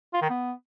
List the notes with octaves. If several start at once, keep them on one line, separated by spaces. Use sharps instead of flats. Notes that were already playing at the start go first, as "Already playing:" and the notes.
F4
D#3
B3